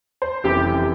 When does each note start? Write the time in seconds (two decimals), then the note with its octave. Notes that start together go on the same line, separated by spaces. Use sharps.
0.22 C5
0.44 F1 F#2 E3 G4